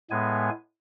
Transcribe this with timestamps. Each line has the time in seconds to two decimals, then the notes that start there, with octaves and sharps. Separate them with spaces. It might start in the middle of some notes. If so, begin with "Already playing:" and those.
0.10 A2 G#3 B3 G#5